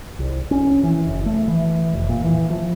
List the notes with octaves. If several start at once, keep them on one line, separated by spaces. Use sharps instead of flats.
C2
C#4
E3
F#1
A3
E3
F1
A#2
E3
F3